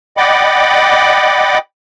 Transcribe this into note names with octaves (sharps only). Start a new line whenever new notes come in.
D5 D#5 F#5 G5 B5 D6